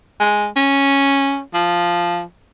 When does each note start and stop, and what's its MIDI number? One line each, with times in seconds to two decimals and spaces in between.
0.20 0.47 56
0.56 1.40 61
1.54 2.23 53